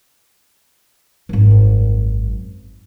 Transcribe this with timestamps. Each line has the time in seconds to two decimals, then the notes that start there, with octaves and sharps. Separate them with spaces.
1.29 G#1 F#2